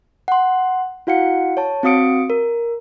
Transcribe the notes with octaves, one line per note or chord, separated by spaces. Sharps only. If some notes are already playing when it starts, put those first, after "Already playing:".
F#5 C6
E4 F#4 F5 F#5 C#7
C#5 A5
C4 F#4 F5 D#6 C#7 D7
A#4